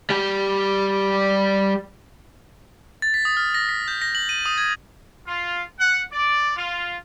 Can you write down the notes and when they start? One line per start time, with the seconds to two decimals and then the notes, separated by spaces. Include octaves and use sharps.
0.10 G3 G4
3.02 A6
3.14 B6
3.25 D#6
3.37 F6
3.54 A#6
3.69 B6
3.88 G6
4.02 A#6
4.15 F#7
4.29 D#7
4.46 D#6
4.58 G#6
5.26 F4
5.78 F#5
6.11 D5
6.56 F4